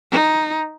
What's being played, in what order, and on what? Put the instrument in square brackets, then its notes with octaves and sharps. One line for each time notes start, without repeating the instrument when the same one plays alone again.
[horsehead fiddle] D#4